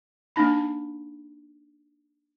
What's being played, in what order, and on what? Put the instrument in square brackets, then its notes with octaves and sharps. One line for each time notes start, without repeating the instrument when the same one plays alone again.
[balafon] A#3 D4 D#4 B5